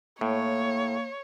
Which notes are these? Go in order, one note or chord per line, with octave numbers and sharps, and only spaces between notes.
A2 A#3 C#5